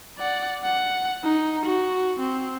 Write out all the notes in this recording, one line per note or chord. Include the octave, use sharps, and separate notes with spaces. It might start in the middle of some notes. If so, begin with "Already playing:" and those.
D5 F#5
F#5
D#4
F#4
C4